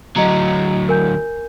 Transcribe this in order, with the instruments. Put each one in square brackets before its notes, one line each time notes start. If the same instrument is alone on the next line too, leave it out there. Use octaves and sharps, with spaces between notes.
[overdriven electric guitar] D2 F#3 [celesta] D#5 A#5
[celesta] A#4 G#5 G6